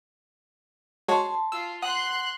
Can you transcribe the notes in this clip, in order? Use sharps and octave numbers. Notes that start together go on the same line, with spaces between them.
G#3 F#4 C#5 A5 C6
F4 E6
F#5 C6 D#6 F#6